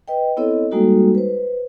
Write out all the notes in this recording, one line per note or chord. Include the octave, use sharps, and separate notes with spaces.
B4 D#5 G5
B3 C4 E4 A4 C#5 D#5
G3 G#3 A#3 D#4 F#4 A4
B4 C5